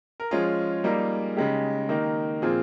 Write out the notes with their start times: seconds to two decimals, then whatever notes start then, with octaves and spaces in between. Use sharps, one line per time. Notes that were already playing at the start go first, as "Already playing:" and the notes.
0.20 A#4
0.31 F3 G#3 C#4 F4 G#4
0.84 G3 A#3 D#4
1.37 C#3 G#3 D#4 G4
1.89 D#3 A#3 D#4
2.42 A#2 F3 C4 F4 G#4